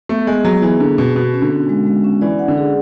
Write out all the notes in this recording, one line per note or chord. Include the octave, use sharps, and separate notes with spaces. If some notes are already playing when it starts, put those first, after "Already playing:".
A3 B3
G#3 B3
F#3 G#4
E3 B3
D3 B3
B2 B3
B2 F#4
C#4
D3
C#4
G#3
G#3
C#4
E3 D5
F#5
D3
G#4